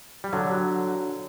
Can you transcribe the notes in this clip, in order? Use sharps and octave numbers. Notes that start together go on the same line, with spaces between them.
G3
D3 F#3